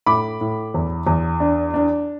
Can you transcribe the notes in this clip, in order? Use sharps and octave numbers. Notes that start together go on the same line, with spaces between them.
A2 B5 D6
A2
E2
E2
D4
D4